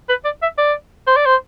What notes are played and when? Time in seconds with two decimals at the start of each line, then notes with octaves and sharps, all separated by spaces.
0.09 B4
0.25 D5
0.43 E5
0.58 D5
1.07 C5
1.17 D5
1.26 C5